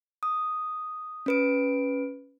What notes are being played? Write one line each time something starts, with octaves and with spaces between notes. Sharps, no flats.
D#6
C#4 B4 D7